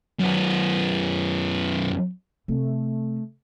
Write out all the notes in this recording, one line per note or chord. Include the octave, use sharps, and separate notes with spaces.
F#2 B3
C3 A3